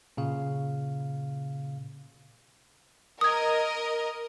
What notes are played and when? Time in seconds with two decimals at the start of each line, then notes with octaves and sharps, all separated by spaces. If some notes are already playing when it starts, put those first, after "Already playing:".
0.17 A#2 C#3 F5
3.21 A#4 D#5 D#6 G#6